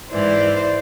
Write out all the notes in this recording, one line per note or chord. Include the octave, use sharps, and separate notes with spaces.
G#2 E3 C5 D5